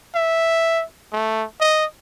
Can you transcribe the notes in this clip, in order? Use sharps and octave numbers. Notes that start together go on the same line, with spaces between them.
E5
A3
D#5